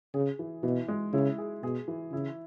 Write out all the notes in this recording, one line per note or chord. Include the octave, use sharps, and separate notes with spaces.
C#3 G#4
E3
B2 E3
G#3
C#3 E4
G#4
B2 G#4
E3
C#3 E4